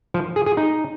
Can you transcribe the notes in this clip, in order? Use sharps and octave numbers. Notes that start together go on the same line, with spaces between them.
F3
G#4
G#4
D#4